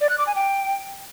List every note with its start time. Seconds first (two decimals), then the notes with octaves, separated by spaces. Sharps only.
0.01 D5
0.09 F#6
0.18 D6
0.27 G#5
0.35 G5